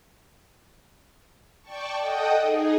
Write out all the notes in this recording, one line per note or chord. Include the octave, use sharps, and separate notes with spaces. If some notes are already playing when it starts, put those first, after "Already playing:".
D5 G5 A5 C#6
A4 D#5 F#5 G5 D#6
D#4 G#4